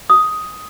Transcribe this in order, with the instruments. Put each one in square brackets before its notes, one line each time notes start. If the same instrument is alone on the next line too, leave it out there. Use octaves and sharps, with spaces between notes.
[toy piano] D#6